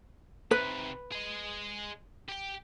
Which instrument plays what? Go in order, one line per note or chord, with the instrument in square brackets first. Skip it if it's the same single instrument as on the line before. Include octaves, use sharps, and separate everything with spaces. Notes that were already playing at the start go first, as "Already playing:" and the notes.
[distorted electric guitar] C3 D#3 [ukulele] B4
[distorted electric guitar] G#4 D#5
G4 G5